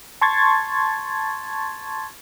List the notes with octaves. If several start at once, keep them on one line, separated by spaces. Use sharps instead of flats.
A5 C6 C#6 G#6 A6